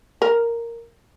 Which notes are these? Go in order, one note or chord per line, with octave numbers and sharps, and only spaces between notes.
A#4